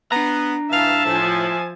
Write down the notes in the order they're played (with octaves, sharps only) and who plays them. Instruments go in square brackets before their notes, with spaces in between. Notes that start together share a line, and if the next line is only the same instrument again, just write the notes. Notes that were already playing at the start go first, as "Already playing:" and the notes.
[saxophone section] B3 [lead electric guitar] D4 A#5
[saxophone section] G2 F5 [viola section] E3 [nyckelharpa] E5 A5
[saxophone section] A2 [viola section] F3 G#5